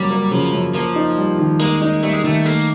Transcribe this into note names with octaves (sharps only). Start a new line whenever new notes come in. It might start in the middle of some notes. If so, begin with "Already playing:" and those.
Already playing: F#2 C#3 F#3 G3 A#3
A#3
C#3 F3
F#2
F3 A#3
D#4
G3
D#3
G#3 A#3
D#4
G3 A3
G#3
D#3 A3
A3 A#3